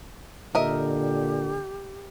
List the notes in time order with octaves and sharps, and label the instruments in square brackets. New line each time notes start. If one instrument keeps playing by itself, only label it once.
[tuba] A#2 [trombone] D3 [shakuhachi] G4 [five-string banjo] A#4 D#5 E5